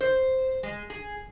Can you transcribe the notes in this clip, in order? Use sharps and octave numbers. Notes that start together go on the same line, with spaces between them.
C5
G#3
G#4